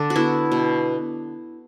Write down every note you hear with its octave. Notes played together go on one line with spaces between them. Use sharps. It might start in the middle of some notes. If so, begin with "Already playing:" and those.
Already playing: D3 D4
F#4
B3 E4
B2